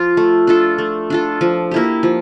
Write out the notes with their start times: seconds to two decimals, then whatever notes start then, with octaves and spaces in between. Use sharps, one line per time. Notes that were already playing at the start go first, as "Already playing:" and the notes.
Already playing: F3 F4
0.17 A3
0.47 D4 F4 A4
0.78 A3
1.10 D4 F4 A4
1.41 F3
1.71 A#3 E4 G4
2.03 F3